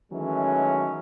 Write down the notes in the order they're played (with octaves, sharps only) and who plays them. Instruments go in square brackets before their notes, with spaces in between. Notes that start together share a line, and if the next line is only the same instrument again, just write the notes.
[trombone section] D#3 E3 F#3 G#3 A3 C#4